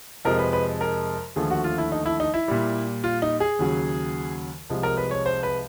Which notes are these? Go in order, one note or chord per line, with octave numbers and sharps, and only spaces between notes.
F2 C3 F3 G#3 A#4
B4
B4
A#4
D#2 D3 F3 A3 G#4
F#4
F4
E4
D#4
E4
D#4
E4
A#2 G3
F4
D#4
G#4
D#2 C#3 F#3
C2 C3 F3 G#3
A#4
B4
C#5
C5
B4